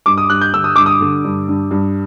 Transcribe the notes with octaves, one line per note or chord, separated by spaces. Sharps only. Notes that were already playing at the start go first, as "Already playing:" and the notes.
G2 D6
D#6
G2 F#6
G6
D3 E6
D#6
G2 D6
D#6
D3
G2
G2
G2